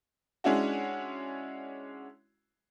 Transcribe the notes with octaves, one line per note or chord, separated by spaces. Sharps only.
G#3 C#4 D4 E4 F#4